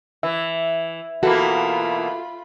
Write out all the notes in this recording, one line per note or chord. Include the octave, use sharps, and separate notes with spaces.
E3 E5
B2 E3 A#3 F4 F#4 A4 B5